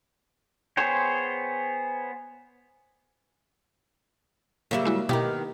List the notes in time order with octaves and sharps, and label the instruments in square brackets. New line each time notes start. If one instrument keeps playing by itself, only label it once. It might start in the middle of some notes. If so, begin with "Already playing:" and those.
[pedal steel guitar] B3 G#4 C5 C#5 G5
[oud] C#3 F#3 G3 [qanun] A#3 E5
[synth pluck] G#3 E4 F#4
[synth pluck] B2 E4 A#5 [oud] D#3 B3 [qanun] G4